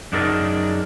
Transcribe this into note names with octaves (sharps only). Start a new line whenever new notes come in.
F#2 D4 D#4 G#4 A#4 D5